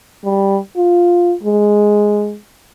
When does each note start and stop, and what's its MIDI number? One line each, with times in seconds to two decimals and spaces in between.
0.24 0.58 55
0.76 1.34 65
1.43 2.35 56